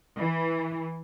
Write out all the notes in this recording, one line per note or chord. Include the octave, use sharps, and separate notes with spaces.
E3